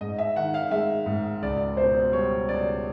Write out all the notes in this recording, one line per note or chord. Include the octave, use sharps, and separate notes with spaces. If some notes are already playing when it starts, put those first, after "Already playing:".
G#2 D#5
E5
D#3 F#5
F5
G#3 E5
G#2
C#2 D5
B2 C5
G3 C#5
C#2 D5